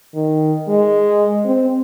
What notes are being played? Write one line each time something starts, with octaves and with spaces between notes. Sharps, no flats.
D#3
G#3
C4